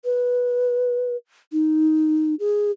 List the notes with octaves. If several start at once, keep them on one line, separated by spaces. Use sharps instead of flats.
B4
D#4
G#4